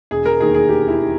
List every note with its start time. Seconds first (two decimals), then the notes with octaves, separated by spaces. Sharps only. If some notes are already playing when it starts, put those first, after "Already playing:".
0.11 E1 G#4
0.26 A#4
0.40 D#2 D#3 G#4
0.54 G#4
0.69 E1 G4
0.88 E4
0.98 D#3